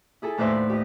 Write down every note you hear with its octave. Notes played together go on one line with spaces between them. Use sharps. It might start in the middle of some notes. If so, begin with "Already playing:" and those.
E4 G#4 A4
D#2 A2 B4 C5 D5 E5
B4
G4 D#5